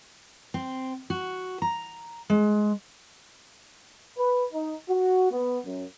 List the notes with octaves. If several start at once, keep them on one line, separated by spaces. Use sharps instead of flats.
C4
F#4
A#5
G#3
B4
D#4
F#4
B3
F#2